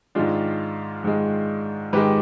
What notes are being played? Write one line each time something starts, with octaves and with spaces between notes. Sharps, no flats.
G#2 D#3 G#3 D4 F4
G#2 D#3 G#3
G#2 D#3 G#3 G4 B4